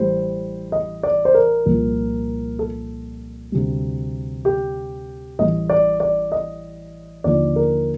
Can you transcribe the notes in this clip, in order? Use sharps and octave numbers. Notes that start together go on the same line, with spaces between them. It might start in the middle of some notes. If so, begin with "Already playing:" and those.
Already playing: A1 A2 G3 C5
D#5
D5
C5
A#4
C2 A#2 F3
A4
D2 C3 G3
G4
A1 A2 G3 D#5
D5
D5
D#5
D#2 D3 F3 D5
A#4